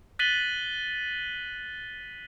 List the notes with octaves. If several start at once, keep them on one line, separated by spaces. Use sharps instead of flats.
F#6 A6 B6 D#7 F#7 G7